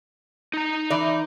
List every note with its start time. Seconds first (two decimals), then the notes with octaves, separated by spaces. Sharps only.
0.54 D#4 A#5
0.90 E3 D5